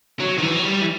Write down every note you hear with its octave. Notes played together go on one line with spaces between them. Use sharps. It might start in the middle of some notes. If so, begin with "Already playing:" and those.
F#3
D#3
E3
F#3
G3
E3